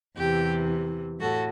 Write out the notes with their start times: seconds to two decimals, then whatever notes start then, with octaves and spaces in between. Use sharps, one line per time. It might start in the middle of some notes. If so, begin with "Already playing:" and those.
0.17 E2 C3 E3 G4
1.21 A2 F#4 A4